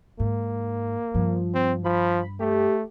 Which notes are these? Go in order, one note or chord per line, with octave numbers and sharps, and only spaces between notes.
G#2 A#3
G2 F3
C4
F3 B5
A3 G4